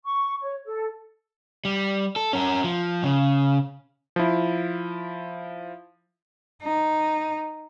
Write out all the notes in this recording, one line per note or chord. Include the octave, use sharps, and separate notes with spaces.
C#6
C#5
A4
G3
A4
C#4 A#4
F3
C#3
F3 E4
D#4